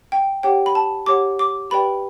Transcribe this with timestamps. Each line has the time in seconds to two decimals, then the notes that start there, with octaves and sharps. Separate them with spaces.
0.12 G5
0.43 G4 C#5 F#5 G5
0.66 B5
0.75 A5
1.06 G4 C#5 F#5 D6
1.39 D6
1.70 G4 B4 D5 G5 B5